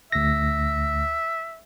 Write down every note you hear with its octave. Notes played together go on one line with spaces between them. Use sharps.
D2 E5 A#6